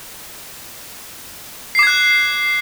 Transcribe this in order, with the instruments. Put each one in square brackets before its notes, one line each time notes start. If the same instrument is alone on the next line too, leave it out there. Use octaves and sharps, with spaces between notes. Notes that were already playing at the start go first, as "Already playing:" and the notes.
[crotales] C7
D6
G#6
F#6